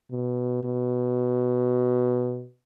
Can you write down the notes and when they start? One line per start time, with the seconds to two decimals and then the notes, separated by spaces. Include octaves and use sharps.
0.11 B2
0.64 B2